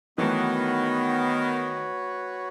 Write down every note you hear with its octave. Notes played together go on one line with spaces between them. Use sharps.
D#3 E3 F#3 A3 B3 F#4 B4 C#5